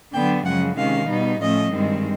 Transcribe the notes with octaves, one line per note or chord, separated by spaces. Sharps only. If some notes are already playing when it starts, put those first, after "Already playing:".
D3 F#3 B3 D4 G5
F#2 C#3 F3 G#3 F#5
C3 D#3 G#3 C#4 F5
B2 G3 B3 D#4
A2 F3 A3 C#4 D#5
G2 D#3 G#3 C4